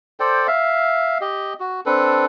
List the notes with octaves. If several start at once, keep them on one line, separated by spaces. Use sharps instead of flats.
A4 C5 D5 G5
E5 F5
G4 D#5
F#4
C4 D4 A4 B4